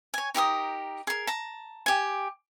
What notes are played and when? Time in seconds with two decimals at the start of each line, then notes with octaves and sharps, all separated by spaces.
0.14 C#5 G#5
0.34 D#4 G4 A#4 D#6
1.07 G#4 A#4
1.27 A5 A#5
1.86 G4 G#5